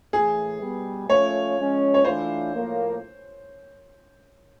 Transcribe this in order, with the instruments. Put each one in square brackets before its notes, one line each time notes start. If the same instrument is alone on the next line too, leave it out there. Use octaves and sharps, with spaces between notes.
[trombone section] A2 E3 A3 [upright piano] G#4
[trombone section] B2 G3 B3
[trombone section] F3 A3 C#4 F4 [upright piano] C#5
[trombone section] F3 G#3 C#4
[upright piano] C#5
[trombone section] E3 A3 D4 F4 [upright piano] C5
[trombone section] A2 F3 A#3